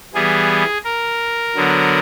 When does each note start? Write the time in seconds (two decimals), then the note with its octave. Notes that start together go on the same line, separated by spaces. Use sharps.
0.14 E3 G3 B3 G#4
0.85 A#4
1.56 D3 F#3 B3